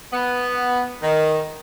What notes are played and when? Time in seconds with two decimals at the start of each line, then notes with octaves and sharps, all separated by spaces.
0.13 B3
1.02 D#3